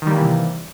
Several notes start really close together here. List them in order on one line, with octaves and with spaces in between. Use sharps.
D#3 G3 A#3 E3 C3